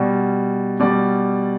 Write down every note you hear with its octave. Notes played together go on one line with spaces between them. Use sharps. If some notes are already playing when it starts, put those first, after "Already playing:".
Already playing: B2 G3
B2 G3 D5